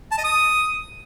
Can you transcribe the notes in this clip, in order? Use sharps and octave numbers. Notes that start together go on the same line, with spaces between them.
A5
D#5
D#6